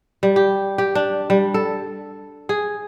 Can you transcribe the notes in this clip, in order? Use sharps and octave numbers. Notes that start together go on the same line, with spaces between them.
G3
G4
G4
D4
G3
A4
G#4